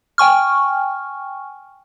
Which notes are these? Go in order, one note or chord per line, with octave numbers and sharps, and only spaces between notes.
G5 G#5 C#6 F6